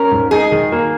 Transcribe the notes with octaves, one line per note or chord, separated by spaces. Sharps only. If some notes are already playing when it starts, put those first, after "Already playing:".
Already playing: C#4 A#4
G#2
D#4 G#4
D#3
A#3